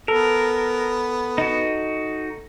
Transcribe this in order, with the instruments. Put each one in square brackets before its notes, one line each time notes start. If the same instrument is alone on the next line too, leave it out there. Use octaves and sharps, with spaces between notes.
[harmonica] B3 [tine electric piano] A4 [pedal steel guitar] A#4
[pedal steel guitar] D#4 F#4